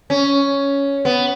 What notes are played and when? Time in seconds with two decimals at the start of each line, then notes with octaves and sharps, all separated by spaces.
0.10 C#4
1.05 B3